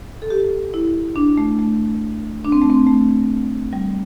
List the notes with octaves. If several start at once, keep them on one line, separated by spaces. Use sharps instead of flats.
A4
G4
E4
D4
A3
A3
D4
C4
A3
C4
A3
G3